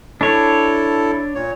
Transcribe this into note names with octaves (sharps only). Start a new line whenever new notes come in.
D4 E4 A4 C#5
A#2 C#5